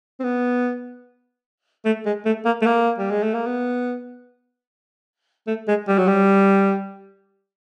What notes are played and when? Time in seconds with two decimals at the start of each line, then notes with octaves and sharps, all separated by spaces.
0.20 C4
0.24 B3
1.85 A3
2.05 G#3
2.25 A3
2.45 A#3
2.61 A3
2.66 A#3
2.98 G3
3.10 G#3
3.23 A3
3.34 A#3
3.46 B3
5.47 A3
5.68 G#3
5.88 G3
5.98 F#3
6.07 G3